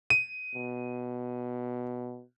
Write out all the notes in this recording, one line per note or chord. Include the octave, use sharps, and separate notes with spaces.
D#7
B2